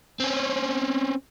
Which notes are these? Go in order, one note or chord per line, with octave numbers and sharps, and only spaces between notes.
C4 C#4